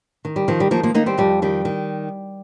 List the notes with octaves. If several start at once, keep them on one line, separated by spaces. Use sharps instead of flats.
D#3
G3
D#3 F3
G3
D#3 F3 A#3
F3 A#3
D#3 A#3 D#4
G3 C4
F2 G3
D#3 G3
D#3